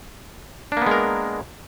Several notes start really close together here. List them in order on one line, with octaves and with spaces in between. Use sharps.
D4 A#3 B3 G#3 A#4